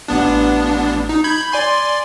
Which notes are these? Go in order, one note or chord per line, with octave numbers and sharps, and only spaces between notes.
A1 B3 D4
D#4
B5 G6 G#6
D5 G#5 C6